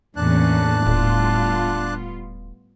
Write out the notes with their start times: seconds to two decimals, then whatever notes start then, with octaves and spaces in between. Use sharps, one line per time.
0.16 E2 A2 A#3 C#4 D4 A5 F#6
0.86 D#1 G3 B3 F4